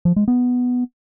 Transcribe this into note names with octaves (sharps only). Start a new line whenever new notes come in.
F3
G#3
B3